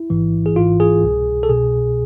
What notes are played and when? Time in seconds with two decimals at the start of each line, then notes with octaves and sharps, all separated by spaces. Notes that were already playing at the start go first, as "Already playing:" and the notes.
Already playing: E4
0.10 A1 G#2 E3
0.46 G#4
0.56 G#1 G#2 E3 F4
0.80 G#4
1.04 C2 B2
1.43 A4
1.49 C2 B2 G#4